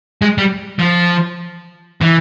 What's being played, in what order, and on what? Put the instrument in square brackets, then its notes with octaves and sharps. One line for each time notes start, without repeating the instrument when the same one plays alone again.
[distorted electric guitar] G#3
G3
F3
E3